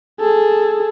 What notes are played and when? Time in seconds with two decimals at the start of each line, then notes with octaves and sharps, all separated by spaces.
0.20 G#4 A4